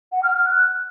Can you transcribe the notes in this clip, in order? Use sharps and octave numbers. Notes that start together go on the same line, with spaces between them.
F#5
F6
F6
F#6